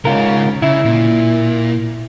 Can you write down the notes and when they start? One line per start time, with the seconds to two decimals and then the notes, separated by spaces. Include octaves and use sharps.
0.05 G#2 C#3 C#4 F4 A#4
0.62 C#3 E4 E5
0.85 A#2